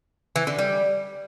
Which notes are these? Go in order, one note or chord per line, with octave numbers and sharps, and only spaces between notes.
E3
D3
G3